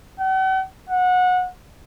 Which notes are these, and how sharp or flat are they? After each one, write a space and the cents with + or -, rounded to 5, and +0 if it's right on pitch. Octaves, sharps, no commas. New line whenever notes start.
F#5 +45
F#5 -25